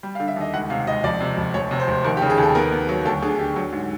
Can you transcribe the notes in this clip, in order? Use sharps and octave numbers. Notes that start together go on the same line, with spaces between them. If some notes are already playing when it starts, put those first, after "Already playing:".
G3
F5
D3
E5
D#2 D#5
C#2 F#5
C3 F5
C#2 D#5
F2 D5
C3
F2
F1 C#5
C3
C5
F1
D#2 A#4
G4
C#3
G#4
D#2 A4
B3 A#4
B3
F#3
D2 A4
D3 G#4
D3 G4
F#3
G#2